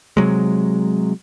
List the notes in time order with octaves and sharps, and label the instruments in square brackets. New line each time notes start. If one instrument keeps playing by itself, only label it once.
[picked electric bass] C3 F#3 G#3